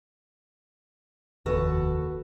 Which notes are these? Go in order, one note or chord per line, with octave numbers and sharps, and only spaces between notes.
F1 D#2 F#4 A4 B4